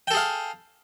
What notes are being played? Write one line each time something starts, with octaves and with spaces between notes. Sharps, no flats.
G#4 A4 F5 G5